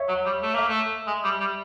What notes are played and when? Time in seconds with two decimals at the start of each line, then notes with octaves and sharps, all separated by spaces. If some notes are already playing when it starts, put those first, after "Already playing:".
Already playing: C#5 E5
0.08 F#3
0.26 G3
0.42 A3
0.55 A#3 E5
0.68 A3
1.07 G#3
1.24 G3
1.40 G3